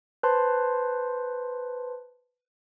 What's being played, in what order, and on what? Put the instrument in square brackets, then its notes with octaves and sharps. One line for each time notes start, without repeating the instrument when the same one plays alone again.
[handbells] B4 C5 A5 C6